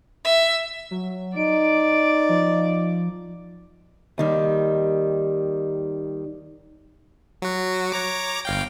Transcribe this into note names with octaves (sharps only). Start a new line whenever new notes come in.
E5
F#3
D#4 D5 D7
F3
D#2 D#3 G3
F#3 F#4
C#5 A#5 D6
G1 F5 G5